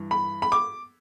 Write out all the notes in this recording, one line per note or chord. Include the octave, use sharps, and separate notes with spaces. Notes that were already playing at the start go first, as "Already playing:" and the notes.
Already playing: G2 E3
B5
B5
D6